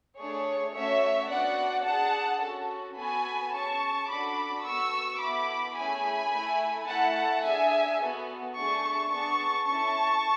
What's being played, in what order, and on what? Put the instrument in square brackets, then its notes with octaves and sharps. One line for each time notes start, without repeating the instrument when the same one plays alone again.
[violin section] A3 D4 G#4 C#5
A3 C#4 F#4 C#5 E5
B3 D4 F#4 D5 F#5
D4 G#4 F#5 A5
C#4 F#4 A4
B3 F#4 A4 G#5 B5
C#4 G#4 A5 C#6
D4 F#4 A4 B5 D6
B3 F#4 A4 C#6 E6
B3 E4 A4 B5 D6
A3 C#4 E4 G#4 G#5 B5
A3 E4 A4
A3 E4 A4 F#5 A5
D4 G#4 E5 G#5
B3 F#4 A4
A3 D4 G#4 A5 C#6
B3 D4 G#4 A5 C#6
C#4 E4 A4 A5 C#6